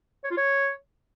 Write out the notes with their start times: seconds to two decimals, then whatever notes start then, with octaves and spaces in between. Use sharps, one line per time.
0.24 C#5
0.31 F4
0.37 C#5